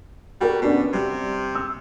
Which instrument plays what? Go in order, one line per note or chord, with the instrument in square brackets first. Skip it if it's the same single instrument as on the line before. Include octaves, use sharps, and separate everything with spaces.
[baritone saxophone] G3 [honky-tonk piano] F#4 A#4
[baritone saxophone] B2 [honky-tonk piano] C#4 D4 F#4
[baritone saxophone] C3 [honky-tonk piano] G3
[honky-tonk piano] E6